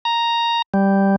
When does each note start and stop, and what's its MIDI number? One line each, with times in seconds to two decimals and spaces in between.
0.05 0.62 82
0.74 1.16 55